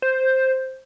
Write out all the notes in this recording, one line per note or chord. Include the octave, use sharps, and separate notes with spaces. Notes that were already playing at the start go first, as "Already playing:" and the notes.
C5